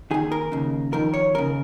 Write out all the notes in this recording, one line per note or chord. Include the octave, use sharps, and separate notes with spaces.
D#2 D#3 G#4
A#4
D#2 C#3
F2 D#3 A#4
C#5
D#2 C#3 A#4